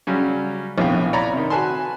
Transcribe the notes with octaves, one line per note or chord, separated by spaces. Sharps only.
C#3 F#3 G3 C#4
A#1 A2 C3 B3 F5 G5
C#5 D5 A#5 B5
C3 D#3
F#4 B4 G#5 A5 C6